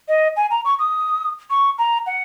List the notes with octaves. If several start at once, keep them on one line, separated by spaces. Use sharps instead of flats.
D#5
G#5
A#5
C#6
D#6
C#6
A#5
F#5